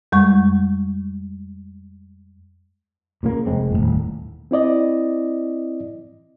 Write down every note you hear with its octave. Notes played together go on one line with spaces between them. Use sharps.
F2 G3 G#3 C#6
A#2 C#3 A#3
F1 G#3 C4
D#1 A#1 A2
C4 E4 D5 D#5